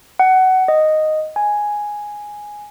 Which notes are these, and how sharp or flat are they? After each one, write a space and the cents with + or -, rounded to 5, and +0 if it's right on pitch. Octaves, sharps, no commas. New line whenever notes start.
F#5 +20
D#5 -5
G#5 +0